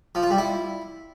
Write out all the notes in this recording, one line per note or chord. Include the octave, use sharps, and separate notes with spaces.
F3
F4
G3
E4